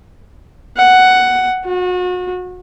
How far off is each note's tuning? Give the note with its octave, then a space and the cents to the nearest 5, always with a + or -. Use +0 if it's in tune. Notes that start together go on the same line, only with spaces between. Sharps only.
F#5 +5
F#4 -35